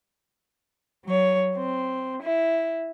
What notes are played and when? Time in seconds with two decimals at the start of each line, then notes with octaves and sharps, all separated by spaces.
1.05 F#3 C#5
1.58 C4
2.23 E4